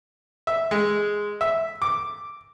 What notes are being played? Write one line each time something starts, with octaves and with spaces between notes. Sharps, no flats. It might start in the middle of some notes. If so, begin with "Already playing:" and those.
E5
G#3
E5
D6